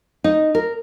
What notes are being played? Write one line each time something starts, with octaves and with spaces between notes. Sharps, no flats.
D#4
A#4